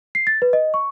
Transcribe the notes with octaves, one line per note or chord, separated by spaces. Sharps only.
C7
A6
B4
D#5
C#6